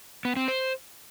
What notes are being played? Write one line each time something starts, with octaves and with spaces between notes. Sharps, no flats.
B3
C4
C5